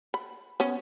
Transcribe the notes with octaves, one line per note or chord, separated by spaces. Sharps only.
B5
B3 C#4